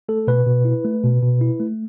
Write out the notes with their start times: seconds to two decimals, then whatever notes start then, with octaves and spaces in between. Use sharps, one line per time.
0.09 A3 A4
0.27 B2 B4
0.46 B2
0.65 E4
0.85 A3
1.04 B2
1.22 B2
1.41 E4
1.60 A3